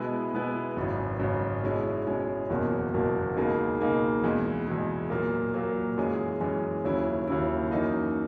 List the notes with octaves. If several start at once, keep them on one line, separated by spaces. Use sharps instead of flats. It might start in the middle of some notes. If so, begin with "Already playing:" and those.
Already playing: B2 G#3 B3 E4 B4
B2 G#3 B3 E4 B4
G#1 F#2 C#3
G#1 F#2 C#3
B2 G#3 C#4 E4 G#4
B2 G#3 C#4 E4 G#4
F#1 E2 B2 A#3
F#1 E2 B2 A#3
C#2 B2 A#3 D#4 G#4
C#2 B2 A#3 D#4 G#4
E2 B2 G#3
E2 B2 G#3
A#2 F#3 A#3
A#2 F#3 A#3
F#2 E3 G#3 C#4 G#4
F#2 E3 G#3 C#4 G#4
D#2 C#3 F#3 C#4 E4
D#2 C#3 F#3 C#4 E4
F#2 E3 A#3 D#4 F#4